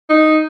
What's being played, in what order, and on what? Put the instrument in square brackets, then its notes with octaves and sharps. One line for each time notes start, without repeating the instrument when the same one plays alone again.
[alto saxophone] D#4